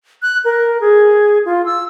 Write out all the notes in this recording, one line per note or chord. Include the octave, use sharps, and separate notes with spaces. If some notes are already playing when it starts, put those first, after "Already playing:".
F#6
A#4
G#4
F4
E6